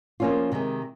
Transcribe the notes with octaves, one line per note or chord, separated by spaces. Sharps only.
F3 A#3 C#4 F4
C3 D#3 G#3